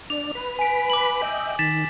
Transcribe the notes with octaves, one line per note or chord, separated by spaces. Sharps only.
D4 D5 F7
B4 B5
G#5 D7
D6 F#7
D#5 E5 G5
D#3 A6 B6 E7